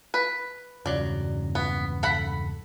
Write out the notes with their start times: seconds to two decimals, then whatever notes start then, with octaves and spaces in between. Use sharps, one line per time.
0.14 B4
0.86 E1 G2 C#3 F#3 D5
1.55 B3
2.03 A4 F#5 B5